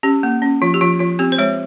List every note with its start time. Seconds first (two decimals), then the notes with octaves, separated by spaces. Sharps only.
0.03 C#4 G4
0.23 A#3
0.42 C#4
0.62 F3 F4
0.74 G4
0.81 F3 F4
0.99 F3 F4
1.19 C4 G4
1.32 C5
1.38 G#3 C#5